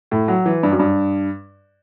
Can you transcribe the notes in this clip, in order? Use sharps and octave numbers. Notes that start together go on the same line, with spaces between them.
A2
F#3
E3
G2
F#2
G2